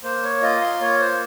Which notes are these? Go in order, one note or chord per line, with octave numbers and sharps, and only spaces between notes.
A#3 C5
C#5
F4 D#5
C6
A#3 C#5
C5